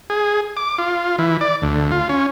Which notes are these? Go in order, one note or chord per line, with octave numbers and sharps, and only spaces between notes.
G#4
D6
F4
E3
D5
D2
F4
C#4